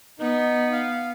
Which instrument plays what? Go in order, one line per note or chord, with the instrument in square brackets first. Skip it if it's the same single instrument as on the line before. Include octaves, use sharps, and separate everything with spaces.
[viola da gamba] B3 [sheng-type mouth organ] D#4
[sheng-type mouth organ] F5